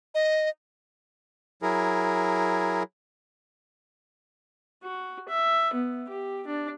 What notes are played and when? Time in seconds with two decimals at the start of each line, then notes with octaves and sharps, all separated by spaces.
0.15 D#5
1.62 F#3 E4 G#4 A#4
4.83 F#4
5.29 E5
5.74 B3
6.09 G4
6.47 D4